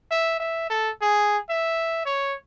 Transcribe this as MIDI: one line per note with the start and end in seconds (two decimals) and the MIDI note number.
0.11 0.37 76
0.40 0.69 76
0.70 0.90 69
1.01 1.37 68
1.50 2.05 76
2.06 2.36 73